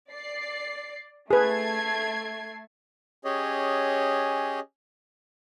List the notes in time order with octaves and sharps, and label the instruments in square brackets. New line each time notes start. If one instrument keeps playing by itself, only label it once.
[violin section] D5 C7
[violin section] A3 G#6 C7 [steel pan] G#4 B4
[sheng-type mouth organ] C#4 G4 G#4 C#5 D#5